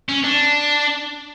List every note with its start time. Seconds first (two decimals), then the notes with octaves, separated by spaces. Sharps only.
0.09 C#4
0.24 D4